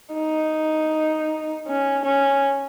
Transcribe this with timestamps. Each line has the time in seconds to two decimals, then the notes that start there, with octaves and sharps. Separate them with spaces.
0.15 D#4
1.68 C#4
2.06 C#4